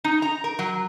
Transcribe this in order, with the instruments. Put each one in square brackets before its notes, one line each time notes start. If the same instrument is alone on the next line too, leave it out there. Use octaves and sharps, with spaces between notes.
[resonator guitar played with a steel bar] D#4
A#5
A#4
F#3